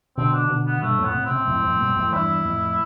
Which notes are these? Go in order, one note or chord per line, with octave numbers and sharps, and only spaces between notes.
B2 D3 C4
D4
B2 D3
B3
G2 B2 A3
F2 A2
B3
A2 C3
C4
A2 C3
F2 A2
F2 A2
G2 B2
F2 A2
E2 G2 E4
F2 A2